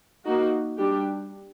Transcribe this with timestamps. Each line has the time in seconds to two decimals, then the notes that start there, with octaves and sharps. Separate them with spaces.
0.24 A#3 D#4 F#4
0.77 G3 D4 G4